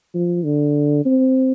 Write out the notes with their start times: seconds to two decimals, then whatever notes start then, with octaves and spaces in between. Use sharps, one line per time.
0.14 F3
0.44 D3
1.06 C4